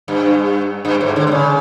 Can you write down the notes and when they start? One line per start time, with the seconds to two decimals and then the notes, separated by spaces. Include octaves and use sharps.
0.08 G2
0.85 G2
1.01 G#2
1.16 D3
1.27 D3
1.31 C#3